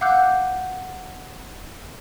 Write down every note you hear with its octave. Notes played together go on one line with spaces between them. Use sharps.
F5 F#5 D6 E6 F#6 G6